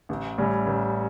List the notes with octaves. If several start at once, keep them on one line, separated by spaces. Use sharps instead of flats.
A1
A2 G3 C#4
A1